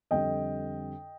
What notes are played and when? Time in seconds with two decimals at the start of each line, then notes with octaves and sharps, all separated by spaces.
0.11 F2 D3 G3 D#5 G5